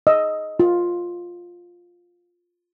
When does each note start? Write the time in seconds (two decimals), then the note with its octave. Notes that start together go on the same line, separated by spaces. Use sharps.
0.07 D#5 E6
0.60 F4